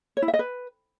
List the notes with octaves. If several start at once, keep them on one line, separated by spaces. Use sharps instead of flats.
C#5
E4
E5
D#5
B4